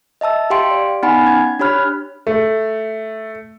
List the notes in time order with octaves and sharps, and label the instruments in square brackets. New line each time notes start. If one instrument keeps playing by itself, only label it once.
[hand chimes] D#5 E5 A5 E6
G4 F5 G5 C6 D7
D5
B3 D#4 F#5 G#5 B5
C#4 G#6
D4 G4 C#5 B5 F6 F#6
[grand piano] A3